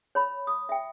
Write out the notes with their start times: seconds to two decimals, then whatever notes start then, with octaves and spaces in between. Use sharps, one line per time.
0.15 C#5 B5
0.47 D#6
0.69 E5 G5